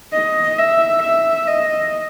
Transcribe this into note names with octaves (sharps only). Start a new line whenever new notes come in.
D#5
E5
E5
D#5